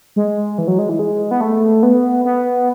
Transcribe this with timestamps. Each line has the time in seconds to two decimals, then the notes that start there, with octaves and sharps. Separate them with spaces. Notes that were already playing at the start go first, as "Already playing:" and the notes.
0.16 G#3
0.58 E3
0.68 F#3
0.79 G#3
0.89 E3
0.99 G#3
1.31 B3
1.41 A3
1.83 B3
2.25 B3